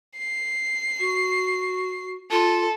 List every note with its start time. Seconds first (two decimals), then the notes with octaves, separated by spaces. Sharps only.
0.18 C7
0.99 F#4
2.31 F4 A4